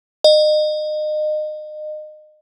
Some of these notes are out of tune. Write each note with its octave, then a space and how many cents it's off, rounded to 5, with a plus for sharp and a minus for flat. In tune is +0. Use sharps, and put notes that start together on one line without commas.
D#5 -30